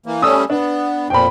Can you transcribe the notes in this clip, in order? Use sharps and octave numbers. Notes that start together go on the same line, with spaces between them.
E3 A#3
G3 A3 C#4 D#6 E6
B3 D4
F2 A#2 F3 G5 B5